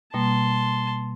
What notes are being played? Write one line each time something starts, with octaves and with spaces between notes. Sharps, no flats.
B2 G3 A#3 A5 C6